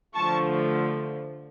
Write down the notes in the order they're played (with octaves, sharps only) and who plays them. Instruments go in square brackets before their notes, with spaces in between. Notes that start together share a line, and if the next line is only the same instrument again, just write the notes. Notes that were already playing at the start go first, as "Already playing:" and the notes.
[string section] D3 F3 A3 A5 C#6